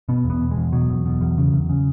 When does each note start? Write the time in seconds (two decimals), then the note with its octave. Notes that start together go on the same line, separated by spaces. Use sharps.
0.09 B2 B3
0.24 E2
0.30 B3
0.41 B2
0.51 G#3
0.57 E2
0.72 B2 F#3
0.89 E2
1.05 B2
1.21 E2
1.38 C#3
1.53 E2
1.69 C#3